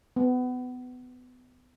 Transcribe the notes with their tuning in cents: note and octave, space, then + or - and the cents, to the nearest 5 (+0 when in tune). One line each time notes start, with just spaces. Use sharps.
B3 +25